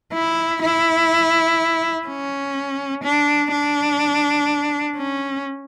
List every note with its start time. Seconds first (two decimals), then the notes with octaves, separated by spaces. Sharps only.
0.13 E4
0.62 E4
2.06 C#4
3.03 D4
3.51 D4
4.97 C#4